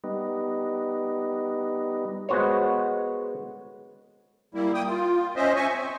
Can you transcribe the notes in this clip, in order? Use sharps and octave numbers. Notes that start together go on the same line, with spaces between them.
G3 B3 D#4
G#3 B3 F#4 C5 C#5
G3 A#3 E4
A#3 G5 D#6
F4
C#4 C5 D#5 E5
E5 G#5 C#6
C4